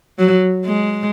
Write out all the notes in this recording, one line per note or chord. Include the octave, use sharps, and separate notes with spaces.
F#3
G#3